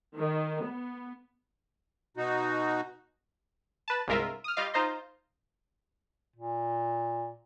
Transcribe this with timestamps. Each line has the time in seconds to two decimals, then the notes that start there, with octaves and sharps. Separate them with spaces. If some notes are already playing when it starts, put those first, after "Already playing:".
0.17 D#3
0.63 B3
2.17 B2 D#4 F#4
3.88 B4 A5
4.07 G1 C2 G#3 F4 A#4 E5
4.44 D#6 F6
4.57 G3 F4 D#5 F5
4.74 D#4 F4 C5 D#5 A#5 C6
6.36 A#2